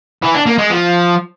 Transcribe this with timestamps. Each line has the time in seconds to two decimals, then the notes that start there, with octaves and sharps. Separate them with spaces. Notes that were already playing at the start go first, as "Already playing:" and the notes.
0.22 E3
0.34 D4
0.46 A#3
0.58 G#3
0.70 F3